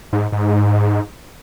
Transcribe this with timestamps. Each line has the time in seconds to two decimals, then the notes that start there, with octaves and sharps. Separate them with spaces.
0.13 G#2
0.32 G#2